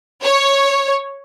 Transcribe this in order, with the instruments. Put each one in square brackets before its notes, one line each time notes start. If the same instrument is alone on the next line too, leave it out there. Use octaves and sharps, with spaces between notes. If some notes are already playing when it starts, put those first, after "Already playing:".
[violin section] C#5